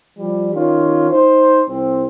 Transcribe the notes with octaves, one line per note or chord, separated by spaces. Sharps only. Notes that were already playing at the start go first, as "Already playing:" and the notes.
F3 G3
D#3 C#4 F4
D#4 C5
C2 C4